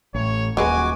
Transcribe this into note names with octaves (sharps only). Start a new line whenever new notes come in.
A1 C#5
D#1 F#3 G#3 F#4 B4 G#5 D6